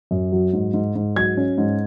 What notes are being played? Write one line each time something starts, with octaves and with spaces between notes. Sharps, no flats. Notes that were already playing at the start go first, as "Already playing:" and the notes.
F#2
F#3
G#2
G#2
G#2
F#3 G#6
C#4
G#2